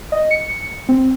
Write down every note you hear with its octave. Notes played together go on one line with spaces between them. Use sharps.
D#5
C#7
C4